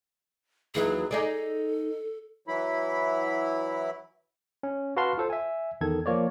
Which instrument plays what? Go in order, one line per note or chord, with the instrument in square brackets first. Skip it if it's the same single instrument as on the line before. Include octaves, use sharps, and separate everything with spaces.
[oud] D#2 E3 F#3 [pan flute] G#4
[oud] D#4 G#4 D5 [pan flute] A4
[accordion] E3 F#3 E4 B5
[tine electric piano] C#4
F#4 B4 F5 A5 C6 F6
F4 A4 C5
E5 G#5
E2 D#3 A4 G#6
F3 A#3 C#5 D5